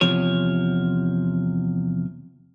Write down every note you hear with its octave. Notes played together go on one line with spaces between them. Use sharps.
E2 C3 F3 C#5